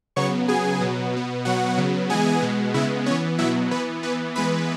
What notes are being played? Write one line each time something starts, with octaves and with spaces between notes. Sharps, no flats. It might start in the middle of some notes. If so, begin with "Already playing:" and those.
C#3 F#3 B3 C#5 C#6
C#3 F#3 B3 G#4 G#5
B2 F#3 B3
B2 B3
B2 F#3 B3 F#4 F#5
C#3 F#3 B3
E3 G#3 B3 G#4 G#5
B2 G#3 B3
C#3 G#3 B3 E4 E5
E3 B3 C#4 C#5
B2 F#3 B3 E4 E5
E3 B3 B4
E3 B3 B4
E3 G#3 B3 B4 B5